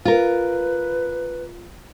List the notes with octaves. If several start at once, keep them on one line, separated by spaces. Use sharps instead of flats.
F4 A#4 B4